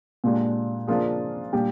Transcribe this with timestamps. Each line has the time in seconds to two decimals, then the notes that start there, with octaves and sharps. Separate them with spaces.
0.24 A#2 G#3 D4 G4
0.87 F3 A#3 D4 F4 G#4
1.53 A#2 G3 D4 G4